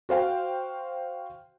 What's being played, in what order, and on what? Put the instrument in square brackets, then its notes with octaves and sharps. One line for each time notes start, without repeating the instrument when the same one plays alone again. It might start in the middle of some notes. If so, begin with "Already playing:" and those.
[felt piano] F#4 C5 F5 G5